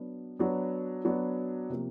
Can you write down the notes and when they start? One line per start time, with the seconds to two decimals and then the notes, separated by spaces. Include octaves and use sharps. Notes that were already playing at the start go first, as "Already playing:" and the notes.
Already playing: F#3 B3 D4
0.39 F#3 B3 D4
1.05 F#3 B3 D4
1.70 C3 F3 A#3